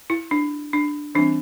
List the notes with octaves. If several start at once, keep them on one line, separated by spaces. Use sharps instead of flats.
E4
D4
D4
E3 G3 C4 D4